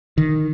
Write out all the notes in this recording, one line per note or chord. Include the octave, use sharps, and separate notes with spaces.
D#3